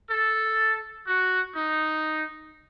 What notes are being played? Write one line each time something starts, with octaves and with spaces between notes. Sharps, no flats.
A4
F#4
D#4